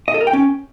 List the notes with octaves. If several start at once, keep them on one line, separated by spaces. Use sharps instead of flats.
D#5
A4
A#4
G5
C#4